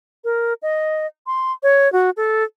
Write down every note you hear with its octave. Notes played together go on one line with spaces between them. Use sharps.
A#4
D#5
C6
C#5
F#4
A4